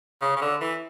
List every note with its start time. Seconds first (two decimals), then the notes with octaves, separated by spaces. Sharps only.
0.22 C#3
0.36 C#3
0.41 D3
0.61 E3